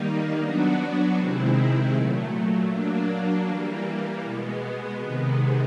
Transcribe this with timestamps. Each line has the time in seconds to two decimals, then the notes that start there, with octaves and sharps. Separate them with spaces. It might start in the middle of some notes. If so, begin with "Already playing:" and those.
Already playing: D#3 G3 A#3 D#4
0.40 F#3 B3 D4 F#4
1.15 C3 D#3 G#3 C4 E4
1.92 A#2 F#3 A3
2.70 F#3 A#3 D4
3.46 E3 G3 A#3
4.23 B2 G#3 B3
4.99 C3 D#3 G#3 B3